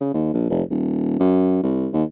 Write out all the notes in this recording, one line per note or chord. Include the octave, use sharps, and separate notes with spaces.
C#3
D#2
A#1
F1
D#1
F#2
C2
D#2